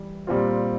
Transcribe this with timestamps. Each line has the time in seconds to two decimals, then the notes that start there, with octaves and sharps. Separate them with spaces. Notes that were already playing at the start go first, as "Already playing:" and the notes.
Already playing: E3 G3
0.27 A#2 G3 C4 F4